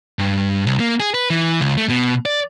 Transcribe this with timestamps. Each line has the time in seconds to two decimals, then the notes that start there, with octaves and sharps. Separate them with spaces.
0.19 G2
0.66 C2
0.80 A#3
1.00 G#4
1.14 B4
1.30 E3
1.60 C#2
1.77 A3
1.90 B2
2.26 D5